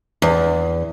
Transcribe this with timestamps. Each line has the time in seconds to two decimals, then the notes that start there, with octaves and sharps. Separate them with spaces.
0.22 E2